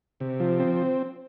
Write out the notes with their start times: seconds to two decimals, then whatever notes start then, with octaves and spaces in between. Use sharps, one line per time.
0.20 C3
0.40 F3
0.60 C4